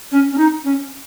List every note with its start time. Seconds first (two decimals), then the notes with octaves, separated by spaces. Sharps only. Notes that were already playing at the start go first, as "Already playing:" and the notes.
0.12 C#4
0.33 C#4
0.38 D#4
0.64 C#4